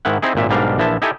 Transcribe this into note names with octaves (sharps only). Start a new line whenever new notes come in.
G#2 D#3 E4 F#5
C4 D#4 E4 G#4
G#1 A#2 E5
B1 G#2 G3 D4 A#4 F5
A#1 E3 F3 E5 A5
D#4 E4 G4 A4 G#5